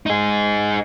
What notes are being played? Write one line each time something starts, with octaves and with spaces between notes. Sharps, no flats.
D#4 G#4